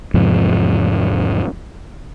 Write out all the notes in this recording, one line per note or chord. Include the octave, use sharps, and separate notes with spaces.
E2 G#2 C3 F3